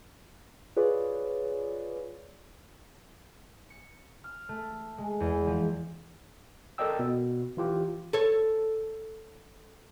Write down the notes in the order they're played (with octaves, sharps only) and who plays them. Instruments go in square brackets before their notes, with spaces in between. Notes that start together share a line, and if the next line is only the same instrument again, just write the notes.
[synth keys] F4 G#4 B4 C#5 D5
[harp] C#7
F6
A3
G#3
E2
F3
[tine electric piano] A4 A#4 D5 D#5 G5 E6
B2
E3 F4 G4
[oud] A4 C#5